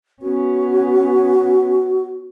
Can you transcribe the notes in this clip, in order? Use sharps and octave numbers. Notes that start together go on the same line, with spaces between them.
B3 C#4 F#4